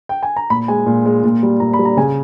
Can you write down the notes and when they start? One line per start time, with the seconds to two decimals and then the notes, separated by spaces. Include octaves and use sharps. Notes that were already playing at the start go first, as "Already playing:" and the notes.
0.09 G5
0.23 G#5
0.37 A#5
0.50 A#2 B5
0.68 G#3 G#5
0.86 A#2
1.06 G#3
1.24 A#2
1.43 G3
1.60 A#2 A#5
1.74 B5
1.79 G3
1.85 A#5
1.97 C#3 G#5